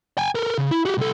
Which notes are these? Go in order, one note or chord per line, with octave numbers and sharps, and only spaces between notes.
G5 G#5
A4 A#4
C#3
E4
F#4 G4
C2 A4